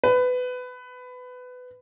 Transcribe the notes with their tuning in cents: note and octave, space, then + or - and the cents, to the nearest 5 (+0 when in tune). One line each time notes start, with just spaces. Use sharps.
B4 +20